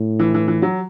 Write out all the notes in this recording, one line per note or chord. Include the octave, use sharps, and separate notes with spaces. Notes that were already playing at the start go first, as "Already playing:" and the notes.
Already playing: A2
E3
E3
E3
F#3